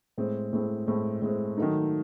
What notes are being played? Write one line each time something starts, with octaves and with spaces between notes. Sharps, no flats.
A2 G#3 C4
A2 G#3 C4
A2 G#3 C4
A2 G#3 C4
D#3 F#3 A3 D#4